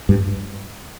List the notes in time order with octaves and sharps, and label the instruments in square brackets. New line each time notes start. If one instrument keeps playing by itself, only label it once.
[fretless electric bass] G2